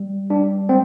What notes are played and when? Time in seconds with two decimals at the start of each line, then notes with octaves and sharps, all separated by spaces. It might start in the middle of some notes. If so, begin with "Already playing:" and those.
Already playing: G3
0.30 G3 D4
0.69 G#3 C4